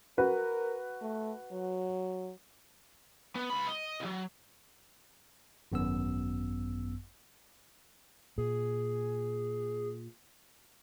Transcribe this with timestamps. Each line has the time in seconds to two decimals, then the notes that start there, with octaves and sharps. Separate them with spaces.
0.18 F#4 A#4 B4
1.02 A3
1.52 F#3
3.35 B3
3.50 C#2 B5
3.67 D#5
4.00 C2 F#3
5.72 G#1 F#2 B3 E6
8.38 A#2 G#4